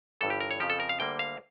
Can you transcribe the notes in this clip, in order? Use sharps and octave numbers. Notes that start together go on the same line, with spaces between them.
G1 G2 E3 A4
G4
A#4
C#5
F2 C#3 F3 G4
A4
A#4
F5
D2 D3 G3 A#3 G5
F5